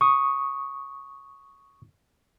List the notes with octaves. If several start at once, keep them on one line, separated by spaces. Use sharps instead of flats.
C#6 D#6